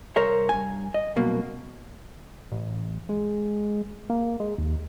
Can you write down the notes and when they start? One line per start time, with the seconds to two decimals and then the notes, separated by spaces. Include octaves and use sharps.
0.16 C2 A#4 C5 C#5 E5
0.49 G2 G#5
0.94 D#5
1.16 C2 F#2 B2 A#3
2.52 A1
3.09 G#3
4.10 A#3
4.40 G#3
4.58 D#2